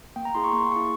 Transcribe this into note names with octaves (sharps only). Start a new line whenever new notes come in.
A#3 G5
A#5
E4 G#4 C6
C#6
A#3 C6
E4 G#4 C#6